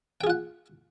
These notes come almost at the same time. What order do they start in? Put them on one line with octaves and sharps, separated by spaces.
G5 G#4 F4 F#5